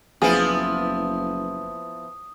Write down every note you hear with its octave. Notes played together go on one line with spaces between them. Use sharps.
F#1 F3 B3 E4 G#4 D#6